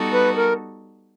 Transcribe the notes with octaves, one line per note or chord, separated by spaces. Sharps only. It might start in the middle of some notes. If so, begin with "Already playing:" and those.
Already playing: G3 B3 D#4 F#4 A4
B4
A#4